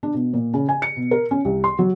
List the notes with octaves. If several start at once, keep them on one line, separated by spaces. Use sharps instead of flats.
D4
B2
A#2
C#3
G#5
C#7
B2
A#4
C#4
C2
C6
F#3